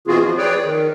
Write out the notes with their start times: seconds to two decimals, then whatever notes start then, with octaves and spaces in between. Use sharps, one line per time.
0.07 B2 E3 C4 F4 F#4 G#4
0.22 F3
0.38 G#4 B4 C#5 D5 G5
0.64 D#3